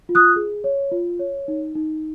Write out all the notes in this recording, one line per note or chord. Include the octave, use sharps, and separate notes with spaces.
F4
D#6 F#6
G#4
C#5
F4
C#5
D#4
D#4